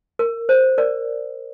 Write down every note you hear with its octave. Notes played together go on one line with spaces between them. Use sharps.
A#4
C5
A#4 D5